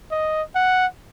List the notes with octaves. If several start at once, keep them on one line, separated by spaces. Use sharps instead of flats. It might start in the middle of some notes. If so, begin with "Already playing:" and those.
D#5
F#5